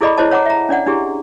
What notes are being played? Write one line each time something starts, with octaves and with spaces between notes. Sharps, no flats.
E4 G#4 A4 D5 D#5 B5
E4 C5 C#5 D#5 A5
C#5 F#5 A#5 D6
E5 A#5
C#4 D4 D5 F#5
D4 E4 G4 G#4